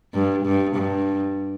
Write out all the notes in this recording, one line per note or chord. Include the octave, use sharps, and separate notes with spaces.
G2
G2
G2